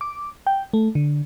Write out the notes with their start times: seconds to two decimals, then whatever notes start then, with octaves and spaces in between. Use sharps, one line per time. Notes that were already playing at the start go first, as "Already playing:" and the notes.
0.01 D6
0.47 G5
0.73 A3
0.95 D3